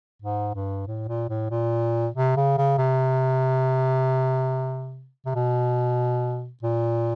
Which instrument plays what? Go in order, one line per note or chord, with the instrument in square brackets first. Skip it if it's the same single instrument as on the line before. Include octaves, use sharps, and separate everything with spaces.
[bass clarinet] G#2
G2
A2
A#2
A2
A#2
C3
C#3
C#3
C3
C3
B2
A#2